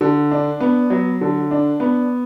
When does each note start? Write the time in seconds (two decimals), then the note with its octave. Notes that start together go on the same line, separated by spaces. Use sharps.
0.01 D3
0.31 D4
0.60 B3
0.90 F#3
1.21 D3
1.51 D4
1.80 B3